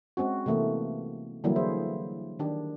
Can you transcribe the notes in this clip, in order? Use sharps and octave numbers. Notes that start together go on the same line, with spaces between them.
G#3 C4 C#4 F#4
C3 E3 A3 A#3
D3 E3 F#3 G3 A#3 E4
G#4 C5 E5
D#3 D4 G4